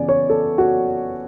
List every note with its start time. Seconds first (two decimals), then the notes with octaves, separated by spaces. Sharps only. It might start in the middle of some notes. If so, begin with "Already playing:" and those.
Already playing: C#3 E3 B3 D5 G#5
0.09 C#5
0.29 A4
0.58 F#4